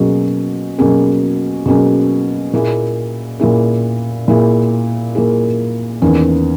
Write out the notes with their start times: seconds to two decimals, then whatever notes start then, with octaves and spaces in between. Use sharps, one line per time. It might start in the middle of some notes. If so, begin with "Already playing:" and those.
Already playing: B2 F#3 A#3 C#4 G#4
0.79 B2 F#3 A#3 C#4 G#4
1.66 B2 F#3 A#3 C#4 G#4
2.53 A#2 A#3 E4 G#4
3.40 A#2 A#3 E4 G#4
4.28 A#2 A#3 E4 G#4
5.15 A#2 A#3 E4 G#4
6.02 E2 D#3 A#3 C#4